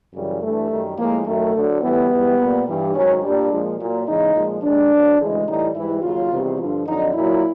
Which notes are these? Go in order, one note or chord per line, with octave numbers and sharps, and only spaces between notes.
F#2 C#3 E3 G3
G2 E3 G3 A3
F#2 D#3 G3
A2 F3 G#3 A#3
F#2 D#3 F#3 A3
D2 D3 F#3
A2 E3 G3 B3
G#2 E3 G3
A#2 G3
G2 E3 G3
G#2 D#3 F#3 C#4
A#2 G3 D4
A#2 F3 G#3
A#2 F#3
E2 C#3 E3 G#3 D#4
A#2 F3 G#3
D#2 D#3 G#3 D4
D2 D3 F#3
D2 C#3 E3 G#3
A2 E3 G3 D#4
G#2 E3 G3 E4
D#2 C#3 F#3 F4
E2 C3 D#3 G3
G2 D3 F3 F4
F2 D3 F#3 D#4
A#2 F#3 E4